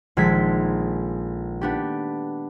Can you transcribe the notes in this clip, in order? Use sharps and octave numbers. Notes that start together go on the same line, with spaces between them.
A#1 D#3 G#3 A4 G#6 B6
B3 D4 G4